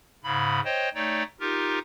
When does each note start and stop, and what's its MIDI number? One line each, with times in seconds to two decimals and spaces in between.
0.24 0.60 44
0.24 0.60 49
0.24 0.60 83
0.65 0.89 72
0.65 0.89 73
0.65 0.89 75
0.65 0.89 79
0.95 1.23 57
0.95 1.23 63
0.95 1.23 73
0.95 1.23 74
0.95 1.23 79
1.40 1.79 63
1.40 1.79 65
1.40 1.79 67
1.40 1.79 70